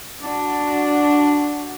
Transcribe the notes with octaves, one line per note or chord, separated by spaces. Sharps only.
D4 F#4